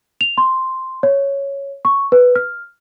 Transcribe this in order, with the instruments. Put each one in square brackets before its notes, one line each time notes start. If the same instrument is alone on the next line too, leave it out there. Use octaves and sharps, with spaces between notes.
[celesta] F7
C6
C#5
C#6
B4
F6